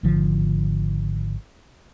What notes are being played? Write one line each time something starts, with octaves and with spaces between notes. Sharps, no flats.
G#1 G#2 D3 F3